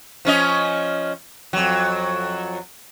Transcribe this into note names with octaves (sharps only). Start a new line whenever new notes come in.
F3 C#4 D#5
F2 F#3